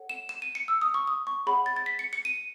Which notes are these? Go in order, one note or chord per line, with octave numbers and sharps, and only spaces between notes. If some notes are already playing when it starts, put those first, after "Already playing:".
Already playing: A4 C#5 F#5
E7
E7
D#7
C#7
E6
D#6
C#6
D#6
C#6
G#4 C#5 F#5 B5
A6
A6
B6
C#7
C#7
D#7